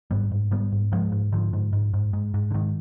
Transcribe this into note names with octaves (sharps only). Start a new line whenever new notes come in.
G#2 G3 B3
G#2
G#2 G3 B3
G#2
G#2 F3 G#3
G#2
G#2 D3 F3
G#2
G#2
G#2
G#2
G#2
D3
G#2 D#3